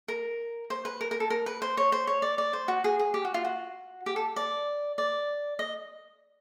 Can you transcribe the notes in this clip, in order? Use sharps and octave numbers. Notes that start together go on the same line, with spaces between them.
A#4
C5
B4
A#4
A#4
A4
A#4
B4
C5
C#5
C5
C#5
D5
D5
C5
F#4
G#4
G#4
G4
F#4
F4
F#4
G4
A4
D5
D5
D#5